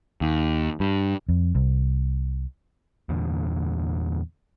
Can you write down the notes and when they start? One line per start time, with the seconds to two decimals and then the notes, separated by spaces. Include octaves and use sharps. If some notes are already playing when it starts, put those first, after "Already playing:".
0.21 D#2
0.80 G2
1.29 F2
1.55 C2
3.09 E2 A#2 D3